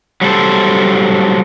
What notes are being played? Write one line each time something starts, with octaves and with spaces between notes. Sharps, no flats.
F#3 G3 A3 A4 C5